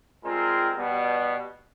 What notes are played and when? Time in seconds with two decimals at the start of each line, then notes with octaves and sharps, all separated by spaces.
0.24 G3 G#3 C4 F4 G#4 A#4
0.76 B2 G3 B3